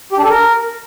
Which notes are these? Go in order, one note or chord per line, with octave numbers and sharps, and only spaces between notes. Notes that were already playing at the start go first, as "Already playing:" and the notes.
G4
D4
A4
A#4